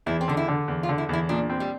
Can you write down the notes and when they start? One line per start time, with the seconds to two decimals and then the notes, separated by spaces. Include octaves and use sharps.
0.06 E2 E4
0.21 C4
0.28 D3 D4
0.37 E4
0.48 D3
0.68 E2
0.83 F4
0.89 D3
0.98 E4
1.09 E2 E4
1.29 A#2 D4
1.50 C4
1.60 G3